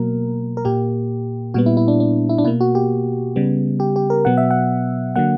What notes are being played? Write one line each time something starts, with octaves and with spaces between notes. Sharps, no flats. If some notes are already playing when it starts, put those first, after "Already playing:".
Already playing: B2 F#3 A#3 A#4
A#4
A#2 A#3 G4
A#2 G3 B3 F#4
E4
E4
D4
D4
E4
D4
B2 A#3 E4
F#4
G4
C#3 G3 B3
G4
G4
A#4
B2 F#3 B3 F#5
E5
F#5
D3 F#3 A#3 F#5